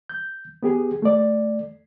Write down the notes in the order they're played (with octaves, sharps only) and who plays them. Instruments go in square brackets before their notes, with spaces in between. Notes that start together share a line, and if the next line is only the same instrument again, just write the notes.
[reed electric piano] G6
B3 G4 G#4
A3 D5